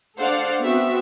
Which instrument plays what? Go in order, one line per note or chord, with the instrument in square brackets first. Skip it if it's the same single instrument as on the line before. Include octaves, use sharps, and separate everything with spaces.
[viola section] D4 A4 C5 D5 F5 F#5
B3 C4 F#4 E5